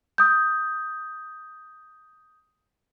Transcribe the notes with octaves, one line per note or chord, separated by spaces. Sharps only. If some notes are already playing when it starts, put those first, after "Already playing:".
D#6 G6